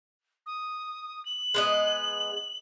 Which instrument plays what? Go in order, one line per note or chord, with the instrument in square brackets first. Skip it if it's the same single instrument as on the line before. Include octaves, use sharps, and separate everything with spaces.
[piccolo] D#6
F#7
[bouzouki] G#3 B3 D#5